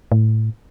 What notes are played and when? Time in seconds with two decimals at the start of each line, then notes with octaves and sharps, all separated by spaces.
0.12 A2